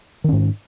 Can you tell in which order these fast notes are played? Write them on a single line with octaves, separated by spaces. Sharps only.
D#3 C#4 G#2